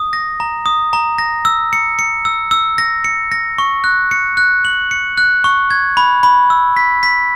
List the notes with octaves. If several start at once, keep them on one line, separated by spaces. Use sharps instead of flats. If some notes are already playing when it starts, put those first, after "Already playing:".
Already playing: D#6
A#6
A#5
D#6
A#5
A#6
E6
C#7
C#7
E6
E6
A#6
C#7
A#6
C#6
F#6
C#7
F#6
F#7
C#7
F#6
C#6
G#6
B5
B5
E6
B6
B6